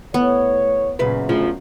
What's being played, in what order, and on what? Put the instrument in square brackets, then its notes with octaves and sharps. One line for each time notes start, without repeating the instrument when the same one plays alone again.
[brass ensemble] A2 C#5 [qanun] B3
[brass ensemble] F#2 [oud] A#2 C#3 B4
[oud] D2 C#3 F3